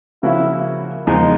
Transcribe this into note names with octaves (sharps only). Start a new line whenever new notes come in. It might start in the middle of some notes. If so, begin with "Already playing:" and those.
C#3 F3 A#3 C#4 E4 F#4
E2 C#3 F3 G#3 D#4